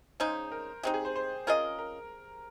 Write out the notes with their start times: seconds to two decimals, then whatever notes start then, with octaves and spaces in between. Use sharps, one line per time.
0.20 C#3 G#3 D#4 C5
0.52 A#4
0.83 G#3 C4 D#4 G4
0.94 G#4
1.05 C5
1.16 C5
1.47 C#4 F4 G#4 A#4 D#5
1.79 A#4